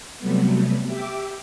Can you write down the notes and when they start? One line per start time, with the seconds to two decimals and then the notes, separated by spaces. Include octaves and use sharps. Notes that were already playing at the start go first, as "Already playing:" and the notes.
0.19 C3 F#3 G3 A3 B3
0.86 G4 E5 G5 D6